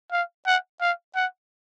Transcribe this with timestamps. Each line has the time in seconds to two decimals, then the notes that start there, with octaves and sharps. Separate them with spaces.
0.12 F5
0.46 F#5
0.81 F5
1.15 F#5